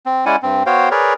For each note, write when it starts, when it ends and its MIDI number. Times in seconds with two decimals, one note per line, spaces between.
0.06 0.25 60
0.26 0.36 56
0.26 0.36 61
0.26 0.36 64
0.26 0.36 74
0.26 0.36 78
0.26 0.36 80
0.43 0.63 43
0.43 0.63 60
0.66 0.89 59
0.66 0.89 66
0.66 0.89 72
0.66 0.89 73
0.66 0.89 77
0.66 0.89 79
0.91 1.14 68
0.91 1.14 70
0.91 1.14 71
0.91 1.14 73
0.91 1.14 74